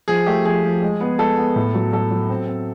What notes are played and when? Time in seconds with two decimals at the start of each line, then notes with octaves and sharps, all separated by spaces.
0.08 F3 G#4
0.26 A3 G4
0.45 F3 G#4
0.64 F3
0.82 G#3
1.01 B3
1.19 G#3 A4
1.38 B3
1.56 A2
1.75 F#3
1.93 F#3 A4
2.11 F#3
2.29 C4
2.48 C4